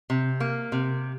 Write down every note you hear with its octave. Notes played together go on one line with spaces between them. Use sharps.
C3
A#3
C3